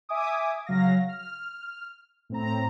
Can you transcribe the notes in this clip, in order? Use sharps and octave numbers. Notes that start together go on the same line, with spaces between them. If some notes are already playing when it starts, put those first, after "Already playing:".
E5 G#5 D6 D#6
C#3 F#3 F5 A#6
F6
A2 C4 A#5